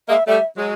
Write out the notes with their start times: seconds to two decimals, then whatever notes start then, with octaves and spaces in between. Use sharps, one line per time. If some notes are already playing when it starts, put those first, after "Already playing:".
0.09 G#3 A#3 E5
0.27 G3 A3 E5
0.56 F#3 G#3